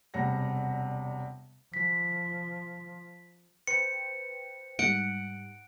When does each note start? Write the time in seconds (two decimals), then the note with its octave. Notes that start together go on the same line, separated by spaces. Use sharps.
0.14 E1 C3 G3 F#5 A#6
1.74 F3 B6
3.67 B4 C5 G5 C#7
4.79 G#2 G3 F#5 D7